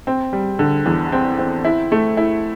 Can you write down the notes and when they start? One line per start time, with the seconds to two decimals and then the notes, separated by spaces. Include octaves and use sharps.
0.07 C4
0.33 G3
0.59 D3
0.86 E2
1.12 C4
1.39 C4
1.65 E4
1.92 A3
2.17 E4